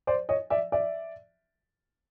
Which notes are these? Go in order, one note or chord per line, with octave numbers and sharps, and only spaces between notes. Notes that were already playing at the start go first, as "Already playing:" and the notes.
C5 D5
C#5 D#5
D5 E5
D5 E5